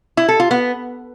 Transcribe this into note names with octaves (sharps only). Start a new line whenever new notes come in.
E4
A4
F4
B3